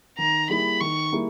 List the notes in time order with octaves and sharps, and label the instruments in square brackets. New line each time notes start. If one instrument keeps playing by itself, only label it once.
[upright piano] D#3 [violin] A#5
[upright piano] G3 A#3 E4 G#4 [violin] B5
[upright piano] D#3 [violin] C#6
[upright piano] G3 A#3 E4 G#4